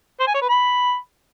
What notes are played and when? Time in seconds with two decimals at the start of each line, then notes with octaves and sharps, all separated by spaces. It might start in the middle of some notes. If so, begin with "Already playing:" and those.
0.19 C5
0.27 G#5
0.34 C#5
0.41 B4
0.49 B5